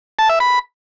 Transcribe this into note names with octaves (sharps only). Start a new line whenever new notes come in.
A5
E5
B5